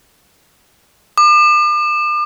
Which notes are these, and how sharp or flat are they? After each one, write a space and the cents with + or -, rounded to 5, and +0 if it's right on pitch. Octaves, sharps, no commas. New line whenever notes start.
D6 +40